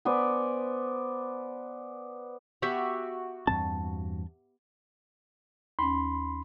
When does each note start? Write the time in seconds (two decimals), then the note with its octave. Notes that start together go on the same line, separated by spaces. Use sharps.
0.05 B3 C5 D5 G#5
2.62 B3 F#4 G4 E5
3.47 E2 G2 C4 A5
5.79 D#2 C#4 B5 C6